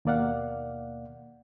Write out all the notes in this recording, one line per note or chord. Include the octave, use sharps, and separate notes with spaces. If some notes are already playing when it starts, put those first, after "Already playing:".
D#2 B2 A#3 D5 F5 F#5